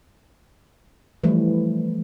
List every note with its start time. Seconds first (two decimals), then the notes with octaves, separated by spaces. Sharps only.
1.24 E3 F3 G3 A3 B4